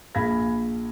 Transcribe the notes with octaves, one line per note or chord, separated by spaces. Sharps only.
A#1 G#4 F5 B5 G#6 A#6